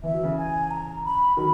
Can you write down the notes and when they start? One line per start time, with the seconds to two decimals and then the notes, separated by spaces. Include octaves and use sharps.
0.03 E3 E5
0.14 F#3
0.23 C#3 E3
0.37 G#5
0.71 A#5
1.04 B5
1.37 D#3 F#3 B5